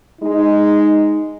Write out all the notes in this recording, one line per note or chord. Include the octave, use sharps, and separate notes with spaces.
G#3 D#4